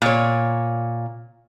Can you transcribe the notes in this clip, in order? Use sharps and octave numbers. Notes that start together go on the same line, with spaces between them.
A#2 C#5